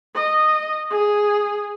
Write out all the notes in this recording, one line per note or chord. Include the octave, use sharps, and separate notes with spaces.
D#5
G#4